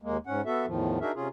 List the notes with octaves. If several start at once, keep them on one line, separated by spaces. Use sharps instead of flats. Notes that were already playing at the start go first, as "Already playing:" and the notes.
D#2 G#3 A#3
G#2 C#4 F#5
B3 F#4 A4 E5
E2 A2 D#3 F3
D4 D#4 F#4 G#4 A#4 E5
C3 C#4 F4 G#4